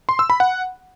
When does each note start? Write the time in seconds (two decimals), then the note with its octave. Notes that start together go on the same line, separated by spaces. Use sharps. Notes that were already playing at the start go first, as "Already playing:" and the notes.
0.09 C6
0.19 E6
0.30 B5
0.40 F#5